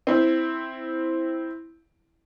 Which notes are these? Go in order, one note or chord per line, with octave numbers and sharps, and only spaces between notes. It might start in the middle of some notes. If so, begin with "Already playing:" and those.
C4 E4